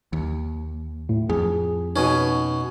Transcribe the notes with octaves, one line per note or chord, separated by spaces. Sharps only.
D#2
A2
F2 G#4
B2 C#4 D#4